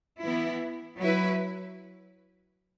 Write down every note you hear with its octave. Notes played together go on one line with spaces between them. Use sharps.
E3 B3 E4
F#3 E4 B4